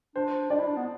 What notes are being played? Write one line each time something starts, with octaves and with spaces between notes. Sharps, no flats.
D4 C5
D4 D5
E4
D4
B3